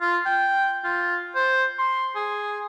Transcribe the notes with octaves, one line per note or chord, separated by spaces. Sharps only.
F4
G5
F4
C5
C6
G#4